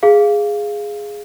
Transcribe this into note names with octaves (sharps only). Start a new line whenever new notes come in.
G#4 F5